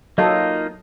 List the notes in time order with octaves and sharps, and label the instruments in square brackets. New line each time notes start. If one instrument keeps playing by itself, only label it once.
[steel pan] F#3 A4 [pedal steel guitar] A#3 D#4 F4 [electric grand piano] D#5